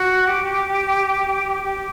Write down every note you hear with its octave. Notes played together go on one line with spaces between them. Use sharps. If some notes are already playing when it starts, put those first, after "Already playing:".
Already playing: F#4
G4
G4